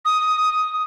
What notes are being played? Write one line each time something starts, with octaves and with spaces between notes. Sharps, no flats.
D#6